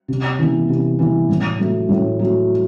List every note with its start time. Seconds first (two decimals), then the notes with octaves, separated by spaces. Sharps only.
0.08 C3
0.39 E3 B3
0.69 C3
0.99 E3 B3
1.29 A2
1.59 F#3 A3
1.89 A2
2.19 F#3 A3